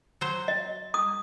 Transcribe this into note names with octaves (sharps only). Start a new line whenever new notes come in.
F#3 C5
D#5
D#6